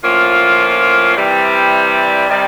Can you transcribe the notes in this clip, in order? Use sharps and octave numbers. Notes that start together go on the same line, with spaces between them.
A2 F3 A#3 C#4 F4
C3 E3 G3
C3 D#3 G3